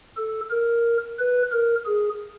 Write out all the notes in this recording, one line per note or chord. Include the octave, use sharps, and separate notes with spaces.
A4
A#4
B4
A#4
G#4